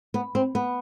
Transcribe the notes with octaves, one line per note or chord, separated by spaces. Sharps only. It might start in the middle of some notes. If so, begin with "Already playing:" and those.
B3
C4
B3